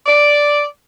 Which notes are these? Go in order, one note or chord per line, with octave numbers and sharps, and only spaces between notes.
D5